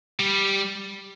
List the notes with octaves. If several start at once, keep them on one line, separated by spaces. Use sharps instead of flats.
G3